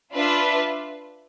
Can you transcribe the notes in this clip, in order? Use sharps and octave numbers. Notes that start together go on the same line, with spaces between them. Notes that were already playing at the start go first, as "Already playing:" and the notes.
D4 F4 B4 E5